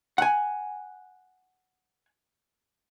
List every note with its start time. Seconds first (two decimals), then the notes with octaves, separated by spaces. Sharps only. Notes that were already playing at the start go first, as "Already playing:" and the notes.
0.18 F#5 G#5